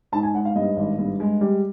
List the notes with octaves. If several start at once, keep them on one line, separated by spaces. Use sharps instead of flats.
G#2 A5
G#5
G#2 F#5
F5
G2 D#5
G#1
G2
G#3
G3